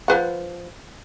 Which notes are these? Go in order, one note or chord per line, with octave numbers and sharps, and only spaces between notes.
F3 B4 F#5